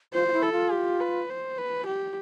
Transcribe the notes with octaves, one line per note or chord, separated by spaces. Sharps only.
F4 C5
F4
E4
A4
F4
G4
B4
C5
B4
G4